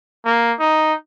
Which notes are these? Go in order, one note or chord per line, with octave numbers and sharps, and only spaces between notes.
A#3
D#4